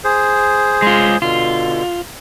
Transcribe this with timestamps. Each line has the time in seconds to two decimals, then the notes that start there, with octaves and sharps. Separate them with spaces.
0.04 G#4 C5
0.82 G#3 F4
1.22 B2 D3 F4